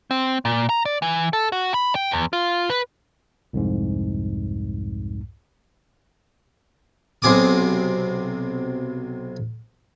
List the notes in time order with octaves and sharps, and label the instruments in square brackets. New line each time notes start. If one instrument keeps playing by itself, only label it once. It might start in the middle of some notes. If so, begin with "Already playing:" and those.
[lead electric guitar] C4
A#2
A#5
D5
E3
A4
F#4
B5
G5
E2
F4
B4
[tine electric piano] C2 F2 G#2
[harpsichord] B1 C3 G#4 D6 D#6